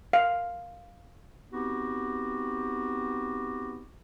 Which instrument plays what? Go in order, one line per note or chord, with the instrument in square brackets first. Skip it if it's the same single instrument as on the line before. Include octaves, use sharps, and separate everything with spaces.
[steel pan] F5
[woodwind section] B3 C4 D#4 F#4 G4